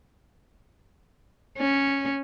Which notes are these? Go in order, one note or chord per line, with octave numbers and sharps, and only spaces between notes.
C#4